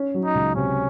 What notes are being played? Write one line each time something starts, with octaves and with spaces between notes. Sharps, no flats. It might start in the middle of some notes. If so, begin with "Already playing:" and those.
Already playing: C#4
F#3
D#4
C#2
C3 C#4